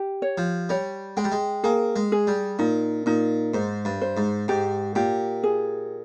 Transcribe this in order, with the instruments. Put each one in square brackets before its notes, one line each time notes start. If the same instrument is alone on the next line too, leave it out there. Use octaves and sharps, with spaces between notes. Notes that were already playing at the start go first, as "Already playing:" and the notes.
Already playing: [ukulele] G4
C#5
[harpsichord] F3
[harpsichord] G3 [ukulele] C#5
[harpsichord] G#3 [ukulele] G5
[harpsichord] G3
G#3
[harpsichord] A#3 [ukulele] G#4
[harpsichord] G#3
[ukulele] G#4
[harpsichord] G3
[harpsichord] A#2 [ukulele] D#4
[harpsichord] A#2 [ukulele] D#4
[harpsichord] G#2 [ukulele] C5
[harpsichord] G2
[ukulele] C5
[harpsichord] G#2
[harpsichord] G#2 [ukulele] G4
[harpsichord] A#2 [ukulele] G4
[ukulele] G#4